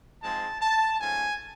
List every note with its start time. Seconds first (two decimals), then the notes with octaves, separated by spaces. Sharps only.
0.22 G#2 F3 G#3 C4 A5
0.61 A5
0.99 G#2 F3 A3 C#4 G#5